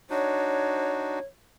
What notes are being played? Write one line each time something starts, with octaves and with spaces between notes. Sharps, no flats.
D4 D#4 F#4 C#5